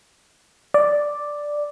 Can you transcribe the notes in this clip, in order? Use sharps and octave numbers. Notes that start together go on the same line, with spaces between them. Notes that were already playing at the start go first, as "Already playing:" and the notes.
D5